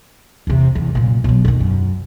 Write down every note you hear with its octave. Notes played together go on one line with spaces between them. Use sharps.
E2 C3
E2
F#2 A#2
B2 F#3
E1 D#3
F#2